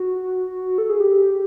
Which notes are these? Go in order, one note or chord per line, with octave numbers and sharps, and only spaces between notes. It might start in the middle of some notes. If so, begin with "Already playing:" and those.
Already playing: F#4
A4
G#4
G4